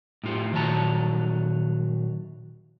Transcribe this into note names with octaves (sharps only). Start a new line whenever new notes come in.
A2 F4 G4
A#2 D#3 F#3 B4 A5 A#5